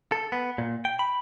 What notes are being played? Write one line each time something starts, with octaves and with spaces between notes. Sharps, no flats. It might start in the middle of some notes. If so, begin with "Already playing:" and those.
A4
B3
A#2
G5
B5